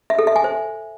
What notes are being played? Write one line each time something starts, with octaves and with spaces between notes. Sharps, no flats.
E5
A4
E5
G#5
C5